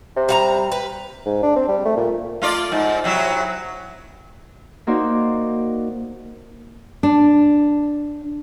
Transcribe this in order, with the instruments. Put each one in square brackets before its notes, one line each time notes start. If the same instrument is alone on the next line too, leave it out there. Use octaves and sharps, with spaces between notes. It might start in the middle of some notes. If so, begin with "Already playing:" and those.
[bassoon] C3
[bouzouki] G3 F5 A#5
B4
[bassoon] G#2
D4
C4
G3
A3
A#2
[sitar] A3 F4 D5
G#2
C3 F#3 E4
[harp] A#3 D#4 F#4 C5 D5
[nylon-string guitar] D4